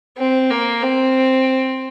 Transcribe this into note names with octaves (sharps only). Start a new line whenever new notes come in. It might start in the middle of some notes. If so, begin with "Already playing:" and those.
C4
A#3
C4